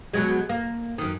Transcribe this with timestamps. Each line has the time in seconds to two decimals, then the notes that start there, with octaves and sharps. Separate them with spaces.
0.14 B2 F#3 G#3
0.49 A#3
0.98 F#2 D#3